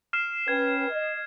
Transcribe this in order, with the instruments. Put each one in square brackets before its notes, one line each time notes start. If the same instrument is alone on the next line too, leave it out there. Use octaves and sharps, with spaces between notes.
[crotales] F6 C7 E7
[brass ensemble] C#4 B4 G5 [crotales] G#6
[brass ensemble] D#5